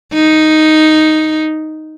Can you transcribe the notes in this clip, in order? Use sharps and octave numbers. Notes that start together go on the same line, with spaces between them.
D#4